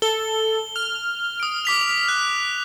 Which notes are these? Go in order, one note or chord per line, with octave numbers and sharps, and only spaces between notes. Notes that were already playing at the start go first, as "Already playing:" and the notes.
A4 G7
F6
D#6 D7
D6 B6 F7
F#6